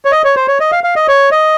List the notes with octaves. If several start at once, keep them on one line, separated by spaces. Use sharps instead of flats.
C#5
D#5
C#5
C5
C#5
D#5
F5
F5
D#5
C#5
D#5